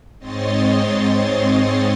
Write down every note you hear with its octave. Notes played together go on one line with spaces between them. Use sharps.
G#2 C4 C#5 D#5 C6 A6